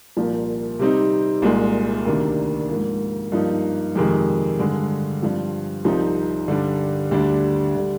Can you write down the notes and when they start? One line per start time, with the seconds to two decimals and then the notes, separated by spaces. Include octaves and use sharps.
0.17 C2 A#2 F3 A#3
0.79 C3 G3 C4 D#4
1.42 C2 A#2 G#3
2.05 D2 C3 D#3 A#3 D4
2.69 G#2 F3 A#3
3.32 G2 F3 A#3 D#4
3.96 F2 C3 D#3 G#3
4.59 G2 D3 G#3
5.22 G2 F3 C4
5.85 C2 C3 F3 C4 D#4
6.48 G2 D3 G3 D4
7.11 D2 D3 G3 D4
7.76 D3 G3